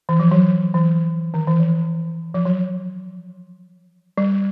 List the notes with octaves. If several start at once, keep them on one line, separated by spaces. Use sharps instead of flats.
E3
F3
F#3
E3
D#3
E3
F3
F3
F#3
G3